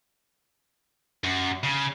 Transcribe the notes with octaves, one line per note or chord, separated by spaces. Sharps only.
F#2
C#3